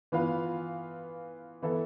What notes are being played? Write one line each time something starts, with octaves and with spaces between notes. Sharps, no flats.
E3 B3 F4 B4 F5
E3 B3 E4 A4